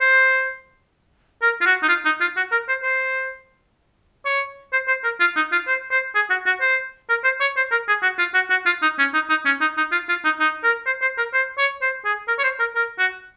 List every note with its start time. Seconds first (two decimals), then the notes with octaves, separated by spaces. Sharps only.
0.01 C5
1.42 A#4
1.61 F4
1.66 F#4
1.83 D#4
1.89 F4
2.05 D#4
2.21 F4
2.37 F#4
2.52 A#4
2.69 C5
2.83 C5
4.25 C#5
4.73 C5
4.88 C5
5.04 A#4
5.20 F4
5.36 D#4
5.52 F4
5.67 C5
5.91 C5
6.15 G#4
6.30 F#4
6.46 F#4
6.61 C5
7.10 A#4
7.24 C5
7.40 C#5
7.57 C5
7.71 A#4
7.88 G#4
8.03 F#4
8.19 F4
8.34 F#4
8.50 F#4
8.66 F4
8.82 D#4
8.98 C#4
9.14 D#4
9.30 D#4
9.45 C#4
9.61 D#4
9.77 D#4
9.92 F4
10.09 F4
10.24 D#4
10.40 D#4
10.64 A#4
10.86 C5
11.02 C5
11.18 A#4
11.34 C5
11.58 C#5
11.82 C5
12.05 G#4
12.28 A#4
12.38 C#5
12.44 C5
12.59 A#4
12.76 A#4
12.99 F#4